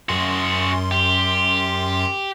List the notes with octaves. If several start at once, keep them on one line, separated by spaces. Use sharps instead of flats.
F#2 F#4 G#4 C6
G4